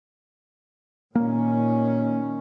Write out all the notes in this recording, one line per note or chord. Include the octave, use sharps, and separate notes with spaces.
A#2 D#3 A#3 C#4